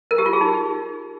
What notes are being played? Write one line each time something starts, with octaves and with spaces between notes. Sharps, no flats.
A#4
G4
F4
G#4
D#4